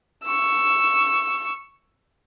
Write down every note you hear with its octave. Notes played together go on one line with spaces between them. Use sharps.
C#6 E6